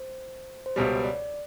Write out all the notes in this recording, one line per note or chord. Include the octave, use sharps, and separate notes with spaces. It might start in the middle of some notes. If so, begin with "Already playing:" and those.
Already playing: C5
C5
C#2 B2 G3 C#5
D5